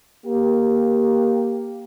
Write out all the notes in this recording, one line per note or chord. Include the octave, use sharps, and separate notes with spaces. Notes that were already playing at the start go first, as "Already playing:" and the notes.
A#3 G4